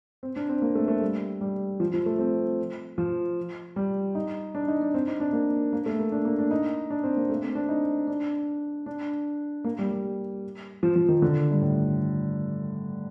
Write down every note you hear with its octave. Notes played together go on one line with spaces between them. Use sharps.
C4
D4
C4
A#3
A3
A3
G3
G3
F3
F3
A3
C4
F3
G3
D#4
D4
D#4
D4
C4
D#4
D4
A#3
A#3
A3
A#3
D4
A#3
D4
D#4
D4
C4
A#3
A3
C4
D4
D#4
D4
D4
A#3
G3
G3
F3
F3
D#3
D3
G2
A2